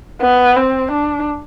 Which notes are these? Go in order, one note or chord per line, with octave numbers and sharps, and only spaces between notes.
B3
C4
D4